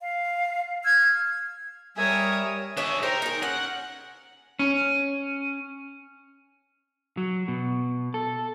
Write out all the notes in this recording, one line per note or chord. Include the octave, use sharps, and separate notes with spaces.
F5
E6 F6 G#6
G3 A#4 C#5 E5 G#5 D#6
D4 G#4 C#5 D#5 E5
D#4 G4 A#4 C5
D#4 G#4
C#4 F#5
C#4
F#3
B2
A4